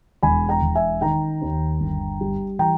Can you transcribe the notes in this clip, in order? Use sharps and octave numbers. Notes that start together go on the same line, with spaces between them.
E1 G#5 B5
G5 A#5
E1
E5 G#5
D#3 G5 A#5
D#2
G1
G3
E3 G5 A#5